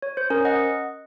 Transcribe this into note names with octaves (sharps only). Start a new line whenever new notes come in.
C#5
C5
C#4 A#4
D#5 F#5